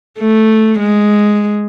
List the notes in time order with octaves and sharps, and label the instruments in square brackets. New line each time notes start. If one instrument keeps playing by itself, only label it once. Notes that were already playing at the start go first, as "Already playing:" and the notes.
[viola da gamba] A3
G#3